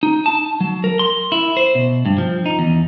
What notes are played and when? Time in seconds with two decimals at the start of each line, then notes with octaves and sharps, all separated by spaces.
0.03 D#4
0.26 A5
0.60 F#3
0.84 A#4
0.99 C6
1.32 E4
1.57 C5
1.75 B2
2.06 G2
2.18 F3
2.46 D#4
2.59 E2